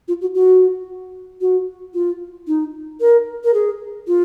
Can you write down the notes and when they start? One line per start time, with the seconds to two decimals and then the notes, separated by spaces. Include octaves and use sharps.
0.08 F4
0.21 F#4
0.34 F#4
1.41 F#4
1.94 F4
2.47 D#4
3.00 A#4
3.44 A#4
3.54 G#4
4.07 F4